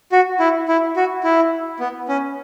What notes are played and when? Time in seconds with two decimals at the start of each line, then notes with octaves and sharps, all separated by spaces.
0.12 F#4
0.40 E4
0.68 E4
0.96 F#4
1.24 E4
1.80 B3
2.09 C#4